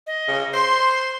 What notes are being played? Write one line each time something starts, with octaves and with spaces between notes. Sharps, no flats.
D#5
C#3
C5 C6